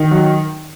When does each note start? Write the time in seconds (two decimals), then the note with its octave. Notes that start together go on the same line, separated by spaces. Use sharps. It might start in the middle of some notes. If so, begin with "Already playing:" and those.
Already playing: D#3
0.11 F#3